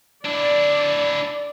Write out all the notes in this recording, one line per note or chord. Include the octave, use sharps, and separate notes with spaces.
D4 E4 D5